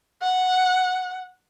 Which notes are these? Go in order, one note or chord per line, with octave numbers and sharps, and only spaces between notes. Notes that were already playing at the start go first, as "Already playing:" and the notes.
F#5